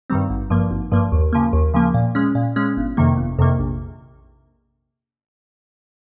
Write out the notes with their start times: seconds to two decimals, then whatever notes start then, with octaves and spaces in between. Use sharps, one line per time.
0.10 G2 D#3 G3 C4
0.30 G#1
0.50 G2 F3 A#3
0.71 G#1
0.92 G2 F3 A#3
1.12 D#2
1.33 C#3 F3 A#3
1.53 D#2
1.74 C#3 F3 A#3
1.94 A#2
2.15 G#3 C#4
2.35 A#2
2.56 G#3 C#4
2.77 G1
2.97 F2 C3 D#3 A#3
3.17 G1
3.39 F2 C3 D#3 A#3
3.59 A#1